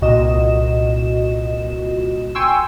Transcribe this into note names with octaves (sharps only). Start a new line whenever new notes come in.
C2 A#2 F#4 D#5 E7
G5 G#5 C6 C#6 E6